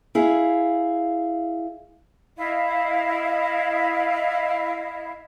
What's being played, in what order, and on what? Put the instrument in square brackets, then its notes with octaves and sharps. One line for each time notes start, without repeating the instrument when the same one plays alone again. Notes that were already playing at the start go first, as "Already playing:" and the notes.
[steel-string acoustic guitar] E4 G#4 F5
[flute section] E4 D#5 F5